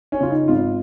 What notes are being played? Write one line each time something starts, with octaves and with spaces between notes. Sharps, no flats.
C#4
C#3 F4
D#4
G#1 F4